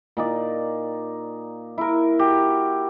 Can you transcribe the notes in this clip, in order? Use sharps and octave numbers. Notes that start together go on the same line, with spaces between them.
A#2 D#4 D5
E4 A#4
F#4 G4